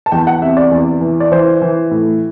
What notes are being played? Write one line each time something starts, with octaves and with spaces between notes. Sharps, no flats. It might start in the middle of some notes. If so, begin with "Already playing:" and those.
A5
E2 G5
F#5
C3 E5
D5
E2
E3
D5
E3 C5
E3
A2